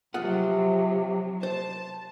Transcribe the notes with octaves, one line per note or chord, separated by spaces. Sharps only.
C3 F3 F#3 F4 G#4 F#5
C5 A5